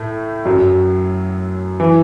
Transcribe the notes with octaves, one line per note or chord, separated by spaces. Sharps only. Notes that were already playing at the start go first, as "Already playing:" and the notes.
Already playing: A2 A3
F#2 F#3
E3